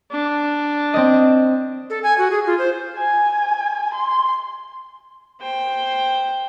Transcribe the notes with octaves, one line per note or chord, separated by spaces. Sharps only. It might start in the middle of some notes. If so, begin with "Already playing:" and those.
D4
C4 D#5
A4
G#5
F#4
G#4
F4
C5
G#5
C6
C5 G5